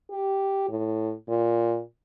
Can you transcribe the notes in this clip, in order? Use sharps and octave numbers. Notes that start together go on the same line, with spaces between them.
G4
A2
A#2